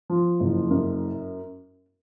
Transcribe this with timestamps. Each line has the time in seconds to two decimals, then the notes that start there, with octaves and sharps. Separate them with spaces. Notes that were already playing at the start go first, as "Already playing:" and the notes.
0.10 F3
0.40 F#1
0.70 F#2